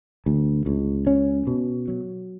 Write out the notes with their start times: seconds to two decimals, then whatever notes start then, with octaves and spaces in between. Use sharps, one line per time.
0.26 D2
0.66 C#2
1.07 C#4
1.47 B2
1.88 F#3